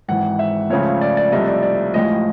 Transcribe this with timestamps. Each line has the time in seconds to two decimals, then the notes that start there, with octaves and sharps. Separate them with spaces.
0.08 G#1 G#2 E3 F#5
0.39 E5
0.70 C#2 C#3 F3 A3 C#5
1.01 D5
1.17 D5
1.32 C2 C3 F3 A3 D#5
1.47 D5
1.63 D5
1.94 A1 A2 F3 G#3 D#5